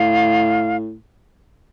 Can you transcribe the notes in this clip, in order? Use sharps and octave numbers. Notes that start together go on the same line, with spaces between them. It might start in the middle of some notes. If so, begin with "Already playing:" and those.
Already playing: A2 F5